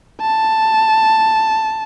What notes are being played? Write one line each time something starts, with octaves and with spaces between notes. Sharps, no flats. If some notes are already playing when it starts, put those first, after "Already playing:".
A5